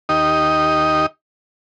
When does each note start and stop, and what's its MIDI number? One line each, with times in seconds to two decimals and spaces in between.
0.09 1.06 39
0.09 1.06 63
0.09 1.06 67
0.09 1.06 75